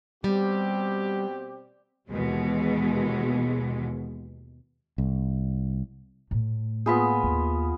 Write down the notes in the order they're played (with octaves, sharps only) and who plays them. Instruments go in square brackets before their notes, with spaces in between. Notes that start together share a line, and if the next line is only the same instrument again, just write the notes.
[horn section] B2 C4 G4 [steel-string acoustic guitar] G3
[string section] D#2 B2 E3 G#3
[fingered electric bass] C2
[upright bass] A2
[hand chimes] A#3 B5 B6 [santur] B3 F4 G#4
[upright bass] D#2